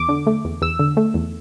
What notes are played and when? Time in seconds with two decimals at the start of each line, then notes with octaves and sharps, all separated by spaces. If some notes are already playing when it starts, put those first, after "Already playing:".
Already playing: E2 D6
0.09 D3
0.27 A3
0.45 E2
0.62 E2 E6
0.79 D3
0.97 A3
1.14 E2